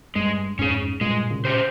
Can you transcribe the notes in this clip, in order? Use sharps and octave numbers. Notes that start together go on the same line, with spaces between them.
G2 G#3
F2 G#2 C#4 G#4
G2 A#2 G#3
A#2 C#3
C#4 G4 C5